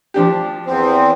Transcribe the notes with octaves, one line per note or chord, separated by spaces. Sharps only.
F3 D4 G4
E2 C4